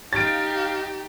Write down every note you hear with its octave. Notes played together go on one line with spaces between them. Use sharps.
D#4 G4 F5 F6 A6 D7